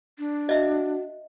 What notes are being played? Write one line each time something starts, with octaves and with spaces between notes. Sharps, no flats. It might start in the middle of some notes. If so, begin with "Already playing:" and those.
D4
F#4 D#5 E5